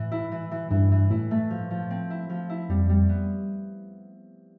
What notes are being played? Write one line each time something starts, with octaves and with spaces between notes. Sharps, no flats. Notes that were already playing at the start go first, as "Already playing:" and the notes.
Already playing: A2 E3
E4
E3
E3
G2 E3
E3
A2 E4
A3
F3
F3
C4
E4
F3
E4
F2 G3
G3
B3